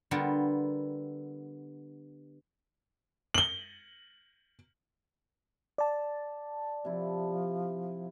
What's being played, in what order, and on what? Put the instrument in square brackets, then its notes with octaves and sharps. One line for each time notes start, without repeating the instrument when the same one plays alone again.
[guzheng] D3 G3 B3 F4 A#4
[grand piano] F#7 G7
[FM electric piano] D5 A5
[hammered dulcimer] C3 E4 [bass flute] F3